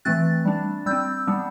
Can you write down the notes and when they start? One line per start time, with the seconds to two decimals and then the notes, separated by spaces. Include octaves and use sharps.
0.05 E3 A3 C4 F#6 A6
0.45 G3 D4
0.86 G3 C4 E6 G6
1.27 G3 B3 D4